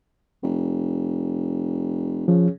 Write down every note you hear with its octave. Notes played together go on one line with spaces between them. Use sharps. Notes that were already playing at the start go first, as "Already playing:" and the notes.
F1
C#3 F3